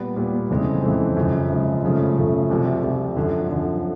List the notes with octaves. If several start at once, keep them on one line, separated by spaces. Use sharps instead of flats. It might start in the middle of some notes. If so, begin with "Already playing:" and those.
Already playing: A#2 G3 B3
A#2 G3 B3
F2 C#3 E3 G#3 C4
F2 C#3 E3 G#3 C4
F#2 C#3 F3 G#3
F#2 C#3 F3 G#3
F#2 C#3 F3 A3
F#2 C#3 F3 A3
C2 C3 F3
C2 C3 F3
F#2 D3 F3
F#2 D3 F3